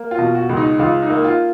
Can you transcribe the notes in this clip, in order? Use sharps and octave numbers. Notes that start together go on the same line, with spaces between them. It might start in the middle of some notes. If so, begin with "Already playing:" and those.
Already playing: A#3
F4
B2
F#4
C#2
D#4
C#2 F4
D#4
A#3
F4